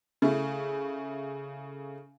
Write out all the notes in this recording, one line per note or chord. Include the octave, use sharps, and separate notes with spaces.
C#3 A3 E4